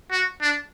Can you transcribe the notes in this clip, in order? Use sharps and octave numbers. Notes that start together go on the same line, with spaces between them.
F#4
D4